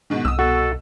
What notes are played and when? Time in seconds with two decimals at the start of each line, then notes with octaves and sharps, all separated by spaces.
0.10 G#2 B2 D#3
0.25 C2 D#6 E6
0.39 B2 F#4 A4